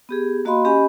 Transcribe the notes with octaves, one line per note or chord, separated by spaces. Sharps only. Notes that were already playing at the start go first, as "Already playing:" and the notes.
B3 G4 G#4
A#3 F#4 D#5 F5 B5 C6
C#4 G4 D#5 G#5 B5